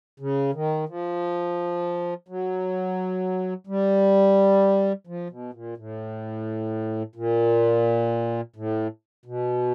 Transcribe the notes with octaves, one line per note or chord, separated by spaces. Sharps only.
C#3
D#3
F3
F#3
G3
F3
B2
A#2
A2
A#2
A2
B2